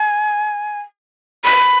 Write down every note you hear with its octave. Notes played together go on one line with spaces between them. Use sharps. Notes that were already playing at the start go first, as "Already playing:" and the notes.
Already playing: G#5
B5